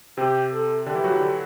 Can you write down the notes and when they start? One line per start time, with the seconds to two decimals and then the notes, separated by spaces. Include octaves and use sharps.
0.17 C3 C4 G4
0.52 A4
0.86 D3 D4 G4
0.95 E3 E4
1.04 F#3 F#4
1.12 E3 E4
1.21 D3 D4